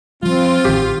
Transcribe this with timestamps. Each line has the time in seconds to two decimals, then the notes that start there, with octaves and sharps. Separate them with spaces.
0.23 F3 G3 C4 F4
0.65 A1 D#3 G4